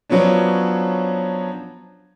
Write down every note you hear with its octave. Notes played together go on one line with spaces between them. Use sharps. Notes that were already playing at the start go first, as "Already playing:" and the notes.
F3 F#3 B3 C#4 D4